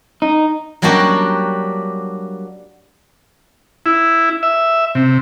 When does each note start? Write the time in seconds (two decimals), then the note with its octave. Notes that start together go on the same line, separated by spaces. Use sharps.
0.22 D#4
0.82 F#3 G3 A#3 D4 F#4 G4
3.86 E4
4.43 E5
4.95 C3